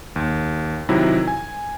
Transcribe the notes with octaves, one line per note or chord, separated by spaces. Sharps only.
D#2
C3 D#3 F#3 E4
G#5